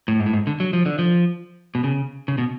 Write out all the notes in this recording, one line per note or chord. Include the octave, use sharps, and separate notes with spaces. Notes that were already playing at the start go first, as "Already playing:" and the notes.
A2
G#2
A2
G#2
D3
F#3
F3
D3
F3
B2
C#3
C#3
B2